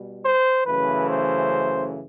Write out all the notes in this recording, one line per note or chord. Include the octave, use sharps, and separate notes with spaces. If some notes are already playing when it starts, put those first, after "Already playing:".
Already playing: B2 G3
C5
F#2 C#3 E3 A3 B4
C5